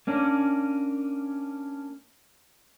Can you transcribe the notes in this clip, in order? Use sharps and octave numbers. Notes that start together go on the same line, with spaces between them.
A#3 C#4 D4